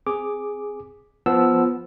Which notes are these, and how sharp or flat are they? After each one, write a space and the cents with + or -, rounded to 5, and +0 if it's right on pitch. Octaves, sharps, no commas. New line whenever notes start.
C4 +0 G#4 +0 D6 +0
F3 +0 B3 +0 E6 +0